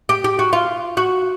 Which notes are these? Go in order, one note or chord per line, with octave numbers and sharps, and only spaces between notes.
G4
G4
F#4
F4
F#4